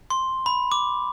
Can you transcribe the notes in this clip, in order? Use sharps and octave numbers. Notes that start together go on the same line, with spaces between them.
C6
B5
D6